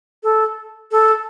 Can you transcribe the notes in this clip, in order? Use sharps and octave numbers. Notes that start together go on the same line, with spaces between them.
A4
A4